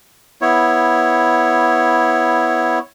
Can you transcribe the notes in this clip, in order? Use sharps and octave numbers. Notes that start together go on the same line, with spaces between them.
B3 E4 C#5